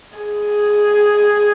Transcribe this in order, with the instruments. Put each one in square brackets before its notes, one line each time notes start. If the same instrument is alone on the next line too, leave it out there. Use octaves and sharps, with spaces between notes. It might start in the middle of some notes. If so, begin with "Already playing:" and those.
[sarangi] G#4